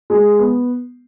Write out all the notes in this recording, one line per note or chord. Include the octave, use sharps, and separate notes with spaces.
G#3
B3